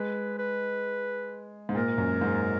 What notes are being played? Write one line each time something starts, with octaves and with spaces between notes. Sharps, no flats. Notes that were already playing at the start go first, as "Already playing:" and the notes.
Already playing: G#3 B4
B4
G#2
A#2 A#4
F#2
G#2